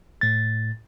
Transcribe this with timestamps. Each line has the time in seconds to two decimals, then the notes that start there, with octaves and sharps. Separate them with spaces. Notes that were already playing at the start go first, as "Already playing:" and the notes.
0.21 A2 A6